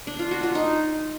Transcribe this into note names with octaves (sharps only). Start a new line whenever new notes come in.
D4
F4
F#4
F4
D#4